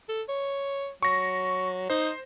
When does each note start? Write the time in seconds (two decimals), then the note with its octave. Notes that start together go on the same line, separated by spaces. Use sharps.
0.09 A4
0.29 C#5
1.03 F#3 C#6 A#6
1.90 D#4 C5